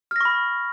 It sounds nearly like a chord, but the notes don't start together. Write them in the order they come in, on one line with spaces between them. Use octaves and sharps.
F6 A#6 C#6 B5